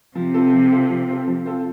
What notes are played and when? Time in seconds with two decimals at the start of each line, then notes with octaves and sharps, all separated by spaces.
0.15 C3 F3
0.34 C4 F4 A4
0.53 F3
0.72 C4 F4 A4
0.90 F3
1.09 C4 F4 A4
1.28 F3
1.45 C4 F4 A4